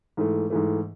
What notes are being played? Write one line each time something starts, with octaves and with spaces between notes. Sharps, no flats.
G#2 E3 A3
G#2 E3 A3